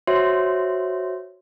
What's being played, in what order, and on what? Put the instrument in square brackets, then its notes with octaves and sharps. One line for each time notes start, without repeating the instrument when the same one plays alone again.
[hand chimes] F#4 C5 C#5 E5 C6